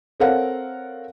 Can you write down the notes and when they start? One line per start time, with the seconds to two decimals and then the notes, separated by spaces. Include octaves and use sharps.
0.20 C4 A4 A#4 C#5 F5 F#5